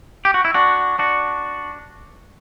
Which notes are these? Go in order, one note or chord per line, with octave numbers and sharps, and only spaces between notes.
G4
F#4
E4
D4 F#4
D4 F#4